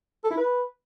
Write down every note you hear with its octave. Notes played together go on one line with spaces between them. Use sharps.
A4
E4
B4